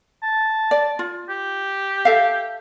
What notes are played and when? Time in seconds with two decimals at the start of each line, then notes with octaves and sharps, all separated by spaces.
0.23 A5
0.71 D5
0.99 F4
1.29 G4
2.05 A4 E5 F5